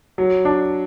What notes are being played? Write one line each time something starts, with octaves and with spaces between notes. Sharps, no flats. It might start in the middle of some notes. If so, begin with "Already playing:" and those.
F#3
D4